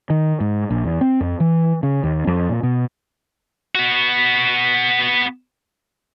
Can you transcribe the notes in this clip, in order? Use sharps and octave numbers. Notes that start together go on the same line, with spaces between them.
D#3
G#2
A#1
E2
C4
F2
E3
C#3
D#2
F2
A#2
B2
B3 F#4